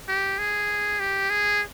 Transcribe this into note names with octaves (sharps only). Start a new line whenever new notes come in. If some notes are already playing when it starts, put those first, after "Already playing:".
G4
G#4
G4
G#4